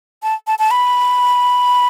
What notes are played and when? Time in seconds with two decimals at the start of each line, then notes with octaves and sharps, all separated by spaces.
0.23 A5
0.47 A5
0.59 A5
0.71 B5